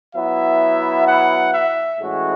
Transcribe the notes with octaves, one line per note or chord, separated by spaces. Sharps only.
F#3 B3 E4 E5
F#5
E5
A2 E3 G#3 C#4 F#4